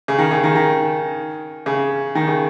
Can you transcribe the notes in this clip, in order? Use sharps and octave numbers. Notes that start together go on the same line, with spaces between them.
C#3
D#3
C#3
D#3
D#3
C#3
D#3
C#3